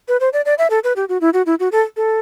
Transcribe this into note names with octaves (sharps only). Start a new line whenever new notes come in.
B4
C5
D5
D5
E5
A4
B4
G4
F#4
E4
F#4
E4
F#4
A4
A4